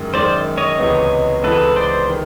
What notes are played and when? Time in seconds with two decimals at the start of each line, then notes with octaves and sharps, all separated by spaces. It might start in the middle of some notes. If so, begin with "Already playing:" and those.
Already playing: F#2 D#3 G#3
0.14 F#2 D#3 G#3 C5 D5
0.58 C#5 D#5
0.79 C#2 C3 E3 G#3 B3
1.43 C#2 C3 E3 G#3 B3 A4 B4
1.76 C5 D5
2.09 D#3